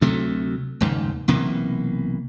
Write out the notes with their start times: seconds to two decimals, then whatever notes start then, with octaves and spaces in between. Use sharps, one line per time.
0.01 D2 C3 F#3 A3
0.81 F1 D#2 G#2 C#3
1.28 B1 C3 E3 A#3